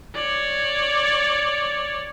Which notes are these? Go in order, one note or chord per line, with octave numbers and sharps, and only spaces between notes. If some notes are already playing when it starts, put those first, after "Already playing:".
C#5 D5